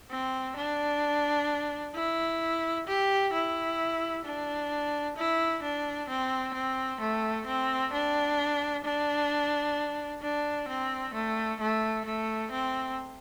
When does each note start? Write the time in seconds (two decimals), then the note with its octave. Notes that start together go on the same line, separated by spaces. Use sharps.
0.10 C4
0.57 D4
1.95 E4
2.87 G4
3.33 E4
4.25 D4
5.17 E4
5.63 D4
6.09 C4
6.54 C4
7.00 A3
7.46 C4
7.93 D4
8.85 D4
10.22 D4
10.68 C4
11.14 A3
11.60 A3
12.05 A3
12.51 C4